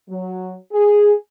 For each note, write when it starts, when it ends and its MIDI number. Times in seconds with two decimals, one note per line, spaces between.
0.10 0.56 54
0.73 1.13 68